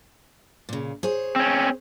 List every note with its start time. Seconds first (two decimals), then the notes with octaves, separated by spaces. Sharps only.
0.69 A#2 C#3
1.03 G#4 C5 C#5
1.36 C4 C#4